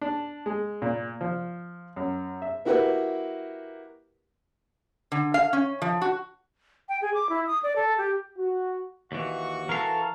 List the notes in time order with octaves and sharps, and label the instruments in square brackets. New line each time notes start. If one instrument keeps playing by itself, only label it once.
[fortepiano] D4
G#3
A#2
F3
F#2
E5
A#3 E4 F#4 G4 A#4 B4
[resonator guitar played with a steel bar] D3
F5
C#4
F3
F#4
[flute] G5
G#4
D6
E4
D#6
D5
A4
G4
[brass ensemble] F#4
[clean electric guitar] D#2 E3 [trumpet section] F#4 C#6
[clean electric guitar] E3 F5 [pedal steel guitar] A4 A#4